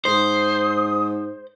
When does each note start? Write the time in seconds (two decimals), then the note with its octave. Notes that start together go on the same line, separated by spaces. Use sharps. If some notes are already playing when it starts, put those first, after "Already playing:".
0.05 G#2 C5 D#6